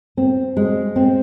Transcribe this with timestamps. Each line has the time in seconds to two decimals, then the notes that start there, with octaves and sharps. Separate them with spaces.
0.17 C4
0.57 G#3
0.96 C4